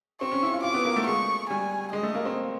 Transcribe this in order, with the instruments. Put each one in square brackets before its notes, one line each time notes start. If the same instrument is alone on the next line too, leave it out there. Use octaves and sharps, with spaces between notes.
[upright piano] C4 [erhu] C#6
[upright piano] C#4
E4
F4
[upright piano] F4 [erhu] D6
[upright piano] B3
A#3
A3
[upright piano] G#3 [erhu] C#6
[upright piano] G3 [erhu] G#5
[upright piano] G#3 [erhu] D#5
[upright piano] A3
A#3
C4